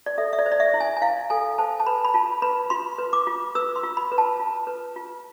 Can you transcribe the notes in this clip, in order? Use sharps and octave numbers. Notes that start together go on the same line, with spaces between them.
D5
A4 E5
E5
D5
C5
D5
E5
E4
G#5
G#5
E4 F5
A4 G#5
C5 A5
A5
B4 B5
B5
F4 A5
B4 B5
F4 C6
B4
D6
F4
B4 E6
C6
F4
B5
B4
A5
F4
B4
F4